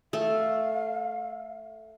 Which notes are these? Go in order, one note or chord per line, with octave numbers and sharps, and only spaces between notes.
A3 F5